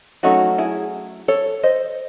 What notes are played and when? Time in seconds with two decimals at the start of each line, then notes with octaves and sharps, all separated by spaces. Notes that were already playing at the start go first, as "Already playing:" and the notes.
0.23 F#3 A3 C#4 D#4 F#4
0.58 E4 G#4
1.28 A4 C#5
1.63 C5 D#5